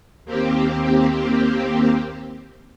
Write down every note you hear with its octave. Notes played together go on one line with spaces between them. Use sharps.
D#2 A#3 C4 G4